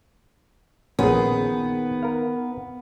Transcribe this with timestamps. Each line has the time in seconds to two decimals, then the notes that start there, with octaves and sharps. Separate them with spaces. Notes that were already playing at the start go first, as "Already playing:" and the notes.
0.99 A#1 A#2 D#3 B3 C#4 G#4
2.03 A#4 B4 F5